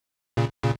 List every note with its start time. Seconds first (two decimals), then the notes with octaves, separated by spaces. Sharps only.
0.37 A#2 C#3
0.63 A#2 C#3